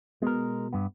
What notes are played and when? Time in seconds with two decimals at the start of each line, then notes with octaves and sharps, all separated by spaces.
0.22 B2 G#3 A#4
0.73 G2 B3